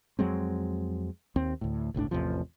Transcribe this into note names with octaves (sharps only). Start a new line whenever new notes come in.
F2 F#3 G#3 C4
D#2 C4
D2 A2
G1 C#2 A2 D4
A1 E2 C3 F3